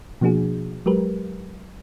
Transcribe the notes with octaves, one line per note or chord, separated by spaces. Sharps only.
B2 F3 A#3 D4 F#4 G#4
F#3 G#3 G4 A#4 B4